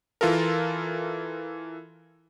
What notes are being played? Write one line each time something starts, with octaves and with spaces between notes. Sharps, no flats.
E3 F4 A4 A#4